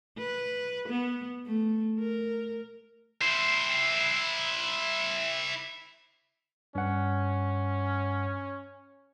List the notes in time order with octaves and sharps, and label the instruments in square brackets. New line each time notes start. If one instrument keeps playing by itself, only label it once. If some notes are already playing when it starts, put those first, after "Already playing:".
[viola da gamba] B4
B3
A3
A#4
[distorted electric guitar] E4 C5
[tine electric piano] G2 F#5 [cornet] C#4